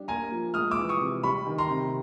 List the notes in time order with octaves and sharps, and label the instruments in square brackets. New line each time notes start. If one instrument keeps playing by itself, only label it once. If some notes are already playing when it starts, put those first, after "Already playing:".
Already playing: [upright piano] G3 D4
[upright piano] A#3 [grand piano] G#5 A#5
[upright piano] F3
[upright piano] G#3 [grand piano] D#6 F6
[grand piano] D6 E6
[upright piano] E3
[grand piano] C#6 D#6
[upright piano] C3
[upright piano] G3 [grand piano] B5 C#6
[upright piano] D#3
[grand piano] A#5 C6
[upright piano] C3